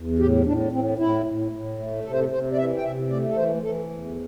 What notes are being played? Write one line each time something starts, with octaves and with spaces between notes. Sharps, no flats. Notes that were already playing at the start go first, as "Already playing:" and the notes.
Already playing: E2
A2 G4
A2 D4
A2 C4
A2 E4
A2
A2
A3
C3 A4
C5
A4
C3 C5
D5
E3 E5
G5
C3 E5
A3 D5
A4
E3 C5
E3 A4
E2